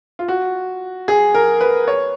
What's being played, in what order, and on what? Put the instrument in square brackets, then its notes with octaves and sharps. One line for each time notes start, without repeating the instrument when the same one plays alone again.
[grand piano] F4
F#4
G#4
A#4
B4
C#5